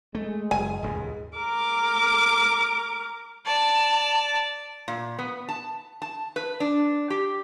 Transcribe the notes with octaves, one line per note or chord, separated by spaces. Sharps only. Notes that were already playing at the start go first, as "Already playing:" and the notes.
G#3 A3
F#1 G#5
D#1 C#2 G#2
A#4 D6
D5 A5
A#2
B3
A5
A5
B4
D4
G4